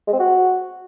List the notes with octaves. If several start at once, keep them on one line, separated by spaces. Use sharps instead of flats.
G#3
C4
F#4